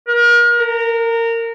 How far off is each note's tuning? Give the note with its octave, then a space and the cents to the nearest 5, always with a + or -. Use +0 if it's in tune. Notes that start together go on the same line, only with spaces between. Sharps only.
A#4 +35
A#4 -20